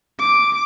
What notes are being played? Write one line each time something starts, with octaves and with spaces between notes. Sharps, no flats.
D6